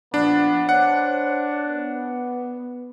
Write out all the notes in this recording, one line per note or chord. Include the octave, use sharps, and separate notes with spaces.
A#2 F3 B3 D4
D4 C5 C#5 F#5
B3